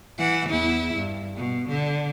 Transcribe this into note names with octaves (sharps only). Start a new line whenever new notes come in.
E3 F#5
E2 E4
G2
B2
D3